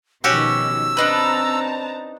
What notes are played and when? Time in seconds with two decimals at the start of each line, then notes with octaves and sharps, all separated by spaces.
0.24 B2 D#3 F3 C#4 F#4 G4 E6
0.97 C4 D4 D#4 B4 A5 A#5